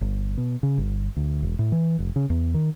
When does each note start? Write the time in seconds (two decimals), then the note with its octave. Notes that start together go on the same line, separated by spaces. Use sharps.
0.01 G1
0.38 B2
0.63 C#3
0.78 G1
1.16 D2
1.43 E1
1.59 A2
1.72 E3
1.99 F1
2.16 C#3
2.30 E2
2.54 D#3